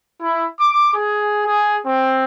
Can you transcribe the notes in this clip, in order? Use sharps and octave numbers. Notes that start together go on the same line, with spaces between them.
E4
D6
G#4
G#4
C4